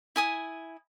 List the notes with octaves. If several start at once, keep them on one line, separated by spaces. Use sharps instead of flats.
E4 G#5 D#6